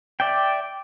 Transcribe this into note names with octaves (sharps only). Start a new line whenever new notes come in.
D5 E5 G5